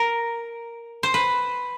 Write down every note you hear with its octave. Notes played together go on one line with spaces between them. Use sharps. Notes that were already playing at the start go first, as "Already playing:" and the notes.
Already playing: A#4
C5
B4